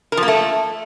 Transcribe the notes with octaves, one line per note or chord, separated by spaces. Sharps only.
A#4
F3
A#3
A3